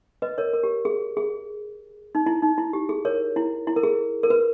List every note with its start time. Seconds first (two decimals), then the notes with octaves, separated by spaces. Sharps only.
0.22 B4 D#5
0.38 A#4 C#5
0.53 A#4
0.63 G4
0.85 G#4
1.17 G#4
2.15 D#4
2.26 E4
2.42 D#4
2.58 E4
2.73 G4
2.89 G#4
3.05 A#4 C#5
3.36 E4
3.67 E4
3.76 A#4
3.83 G#4
4.23 A#4
4.30 B4